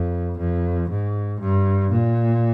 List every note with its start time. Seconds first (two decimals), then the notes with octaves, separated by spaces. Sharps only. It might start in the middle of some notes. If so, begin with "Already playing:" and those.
Already playing: F2
0.38 F2
0.90 G#2
1.40 G2
1.92 A#2